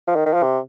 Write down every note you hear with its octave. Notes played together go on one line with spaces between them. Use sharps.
F3
D#3
D#3
F3
C3